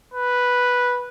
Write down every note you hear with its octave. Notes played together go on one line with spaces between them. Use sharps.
B4